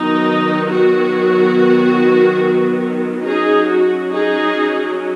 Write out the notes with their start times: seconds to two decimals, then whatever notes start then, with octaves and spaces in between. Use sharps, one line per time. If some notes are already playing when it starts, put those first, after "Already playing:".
Already playing: D#3 F#3 B3 D#4
0.69 F#4
3.26 F#3 C#4 D#4 G#4
3.68 F#4
4.11 D#4 G#4